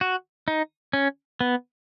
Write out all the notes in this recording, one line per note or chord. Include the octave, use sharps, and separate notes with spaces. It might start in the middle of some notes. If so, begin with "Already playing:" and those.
F#4
D#4
C#4
B3